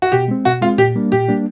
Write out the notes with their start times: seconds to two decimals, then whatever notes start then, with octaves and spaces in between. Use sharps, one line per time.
0.02 F#4
0.12 B2 G4
0.28 G#3 C4
0.45 B2 F#4
0.61 G#3 C4 F4
0.78 A#2 G4
0.96 G3 A#3 D4
1.12 A#2 G4
1.28 G3 A#3 D4